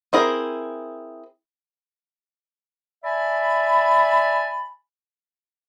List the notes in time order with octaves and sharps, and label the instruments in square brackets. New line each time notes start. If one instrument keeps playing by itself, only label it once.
[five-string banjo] C4 E4 G#4 A#4
[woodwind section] D5 E5 G#5 A5 B5